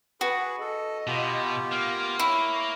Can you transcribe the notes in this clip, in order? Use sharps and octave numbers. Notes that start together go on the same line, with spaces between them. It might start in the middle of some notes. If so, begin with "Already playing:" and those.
F#4 G#4 B4
A4 D#5
B2 B3 F4 G4
A#3 F6
E4 C#5 C#6